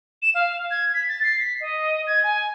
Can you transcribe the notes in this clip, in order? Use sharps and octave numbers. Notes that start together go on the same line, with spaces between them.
E7
F5
G#6
B6
A6
C7
B6
D#5
G#6
G#5